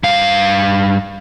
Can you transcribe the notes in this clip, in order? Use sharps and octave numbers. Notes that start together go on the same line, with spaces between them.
G2 F5